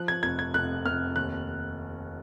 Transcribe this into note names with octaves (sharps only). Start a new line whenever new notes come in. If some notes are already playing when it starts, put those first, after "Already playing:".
Already playing: F3 F#6
G#6
F1 G#6
G#6
F1 F#6
F1 F6
D#2 F#6